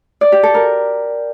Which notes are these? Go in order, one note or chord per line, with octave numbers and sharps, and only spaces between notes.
D5
G4
A4
A#4